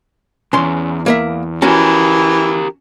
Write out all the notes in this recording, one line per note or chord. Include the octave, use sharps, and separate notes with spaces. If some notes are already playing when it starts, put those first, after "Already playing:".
B1 E2 C#4 C6
A#3 A#4 E5
E3 C#4 F#4 G4 A#4 G#5